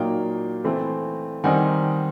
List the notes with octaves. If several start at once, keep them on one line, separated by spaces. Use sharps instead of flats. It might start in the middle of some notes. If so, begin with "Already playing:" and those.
Already playing: A#2 F#3 A#3 D#4 F5 G5
E3 A3 C4
D#3 G3 C4 D#4 F#5 G#5